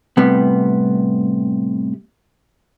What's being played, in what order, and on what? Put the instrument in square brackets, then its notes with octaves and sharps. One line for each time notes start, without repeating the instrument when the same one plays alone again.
[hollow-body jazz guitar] A2 C3 G3 B3